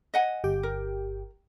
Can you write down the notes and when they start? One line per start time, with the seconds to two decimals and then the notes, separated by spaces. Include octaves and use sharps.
0.14 D#5 F#5 G#5
0.44 G1 G4 G5
0.63 A#4